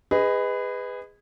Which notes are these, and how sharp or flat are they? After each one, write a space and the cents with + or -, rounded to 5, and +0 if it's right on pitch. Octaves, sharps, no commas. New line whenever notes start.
G#4 -25 B4 +15 D#5 +5